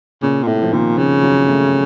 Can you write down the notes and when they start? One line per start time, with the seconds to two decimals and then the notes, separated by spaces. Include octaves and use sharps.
0.22 A#2 C#3
0.43 A#2
0.47 A2 C3
0.62 F3
0.73 A#2 D#3
0.97 C#3 F3
1.23 F#3
1.48 A3